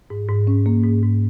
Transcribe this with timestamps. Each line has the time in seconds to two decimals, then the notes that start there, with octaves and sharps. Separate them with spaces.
0.10 G#2
0.29 G#2
0.47 C#4
0.66 A#3
0.84 G#2
1.03 G#2